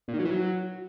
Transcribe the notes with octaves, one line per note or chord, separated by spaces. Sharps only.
A#2
D#3
F#3
E3
F#3